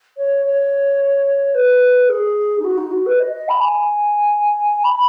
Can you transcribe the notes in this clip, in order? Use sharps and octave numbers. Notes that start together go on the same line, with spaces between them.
C#5
C#5
B4
G#4
D#4
F#4
D#4
F#4
B4
D#5
D#5
B5
G#5
B5